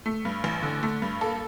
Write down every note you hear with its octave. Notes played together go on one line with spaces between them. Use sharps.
A3
G2
A1
D3
A3
G2
A#3 A4